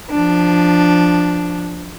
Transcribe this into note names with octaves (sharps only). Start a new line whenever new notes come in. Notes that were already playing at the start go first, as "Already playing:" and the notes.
F3 D4